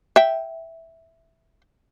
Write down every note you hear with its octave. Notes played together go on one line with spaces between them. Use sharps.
E5 G5